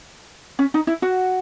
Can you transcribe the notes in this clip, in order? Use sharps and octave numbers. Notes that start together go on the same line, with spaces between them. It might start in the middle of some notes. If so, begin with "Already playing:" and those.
C#4
D#4
E4
F#4